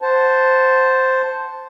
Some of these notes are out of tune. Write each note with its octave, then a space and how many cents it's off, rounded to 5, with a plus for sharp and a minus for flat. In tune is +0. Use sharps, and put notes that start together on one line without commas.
C5 +0 F#5 +0 A5 +0